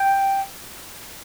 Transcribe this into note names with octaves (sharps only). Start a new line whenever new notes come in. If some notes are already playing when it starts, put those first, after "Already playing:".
Already playing: G5